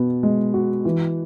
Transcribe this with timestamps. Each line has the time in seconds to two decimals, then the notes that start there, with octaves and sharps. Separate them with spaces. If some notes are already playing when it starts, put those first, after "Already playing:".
Already playing: B2 B3
0.23 G#3
0.54 F#4
0.85 E3